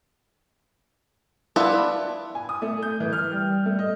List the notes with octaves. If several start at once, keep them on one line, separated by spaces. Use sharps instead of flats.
B3 D4 E4 F4 B4
G#5
D#6
A3
G6
E3
F6
G3
A3
D#5